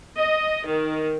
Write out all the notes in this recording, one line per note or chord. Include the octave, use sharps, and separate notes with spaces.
D#5
D#3